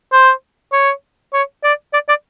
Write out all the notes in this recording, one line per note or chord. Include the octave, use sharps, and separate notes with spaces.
C5
C#5
C#5
D5
D5
D5